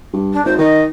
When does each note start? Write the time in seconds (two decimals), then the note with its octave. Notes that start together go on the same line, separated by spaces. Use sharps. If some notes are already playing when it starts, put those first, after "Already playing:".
0.13 G2
0.33 D4
0.45 G#1 C5
0.59 D#3 D#5